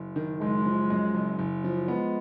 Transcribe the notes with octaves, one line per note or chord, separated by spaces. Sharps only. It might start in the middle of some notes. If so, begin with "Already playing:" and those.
Already playing: F#1
D#3
F#1 G#3
F3
F#2
F#1
F#1
F3
G#3 B3